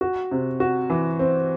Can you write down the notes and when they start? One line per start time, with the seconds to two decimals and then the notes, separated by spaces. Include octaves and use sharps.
0.01 F#4
0.31 C3
0.60 F#4
0.90 E3
1.19 C4